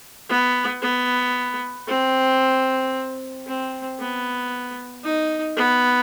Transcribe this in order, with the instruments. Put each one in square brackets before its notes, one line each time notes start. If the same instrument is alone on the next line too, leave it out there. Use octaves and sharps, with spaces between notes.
[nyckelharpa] B3
B3
C4
C4
B3
D#4
B3